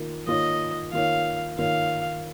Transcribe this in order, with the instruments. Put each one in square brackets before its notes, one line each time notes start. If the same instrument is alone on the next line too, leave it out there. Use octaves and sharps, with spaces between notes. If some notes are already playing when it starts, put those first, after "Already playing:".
Already playing: [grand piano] D#3 A#3 F4 A#4
[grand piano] D#3 A#3 F4 A#4 C#5 [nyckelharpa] D#5
[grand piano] D#3 A#3 F4 A#4 C#5 [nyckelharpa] F5
[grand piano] D#3 A#3 F4 A#4 C#5 [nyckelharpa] F5